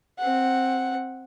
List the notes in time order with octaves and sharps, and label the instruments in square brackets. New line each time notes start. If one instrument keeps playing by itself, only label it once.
[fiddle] C4 F#5